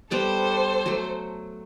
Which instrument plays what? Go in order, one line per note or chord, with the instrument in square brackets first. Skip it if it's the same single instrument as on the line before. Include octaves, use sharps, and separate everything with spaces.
[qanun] G3 B3 D5 [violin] A4 C5
[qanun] F#3 A3